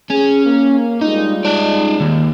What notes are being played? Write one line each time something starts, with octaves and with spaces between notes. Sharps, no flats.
C#4 G#4
A#3
G3 G#3 D#4 F4
D#4 D5
D#2